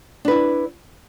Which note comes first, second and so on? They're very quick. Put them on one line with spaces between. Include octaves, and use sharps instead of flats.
D4 B4 E4